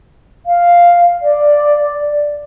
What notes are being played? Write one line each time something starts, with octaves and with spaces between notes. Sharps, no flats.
F5
D5